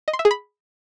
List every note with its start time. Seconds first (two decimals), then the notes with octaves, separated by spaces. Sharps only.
0.08 D#5
0.13 C6
0.19 E5
0.25 G#4
0.31 B5